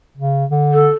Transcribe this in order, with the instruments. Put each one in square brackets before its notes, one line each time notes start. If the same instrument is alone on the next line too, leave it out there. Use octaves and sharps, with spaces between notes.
[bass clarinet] C#3
D3
[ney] A4